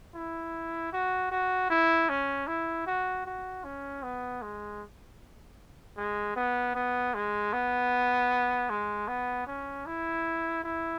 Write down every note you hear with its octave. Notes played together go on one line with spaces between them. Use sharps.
E4
F#4
F#4
E4
C#4
E4
F#4
F#4
C#4
B3
G#3
G#3
B3
B3
G#3
B3
G#3
B3
C#4
E4
E4